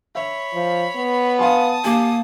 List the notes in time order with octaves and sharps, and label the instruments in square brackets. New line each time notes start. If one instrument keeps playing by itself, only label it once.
[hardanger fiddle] C#5 B5 [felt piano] E5
[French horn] F3
B3
[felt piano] F5 G#5 C6 [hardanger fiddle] A5 D#6
[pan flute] A#3 [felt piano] G4 G#5